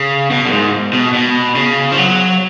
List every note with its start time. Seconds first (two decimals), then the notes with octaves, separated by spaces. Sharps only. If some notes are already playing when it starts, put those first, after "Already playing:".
Already playing: C#3
0.31 B2
0.46 F#2
0.52 G#2
0.93 B2
1.14 B2
1.56 C#3
1.92 F3
1.97 F#3